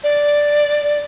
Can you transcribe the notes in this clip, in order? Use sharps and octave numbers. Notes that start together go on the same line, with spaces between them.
D5